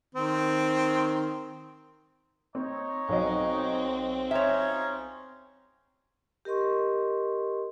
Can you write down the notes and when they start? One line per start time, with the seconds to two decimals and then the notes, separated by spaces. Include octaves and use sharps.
0.15 D#3 C4
2.55 C4 D#4 C#5
3.09 B1 F#3 C4 D#5
4.31 C#4 D#4 F4 C#5 E5
6.45 G4 A#4 D#5 C6 C#6